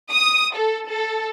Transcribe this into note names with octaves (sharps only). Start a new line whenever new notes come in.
D#6
A4
A4